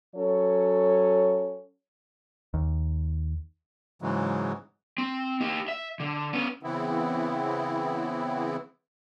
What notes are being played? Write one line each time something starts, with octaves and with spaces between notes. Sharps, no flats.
F#3 C#4 A4 C#5
D#2
G#2 C#3 E3 F#3 G#3
C4
D#4 G4
E5
D3
B3 C#4
C#3 E3 B3 C4 E4